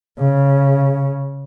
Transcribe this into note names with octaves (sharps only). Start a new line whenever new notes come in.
C#3